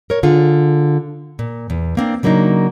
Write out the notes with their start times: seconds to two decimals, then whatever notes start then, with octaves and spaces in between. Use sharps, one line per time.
0.10 A#4 C#5
0.23 D3 F4 G#4
1.39 A#2
1.70 E2
1.97 A#3 C4 D4
2.23 C#3 F#3 A#3 D4 D#4